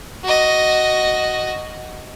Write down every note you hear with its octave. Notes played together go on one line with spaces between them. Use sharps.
F#4 D#5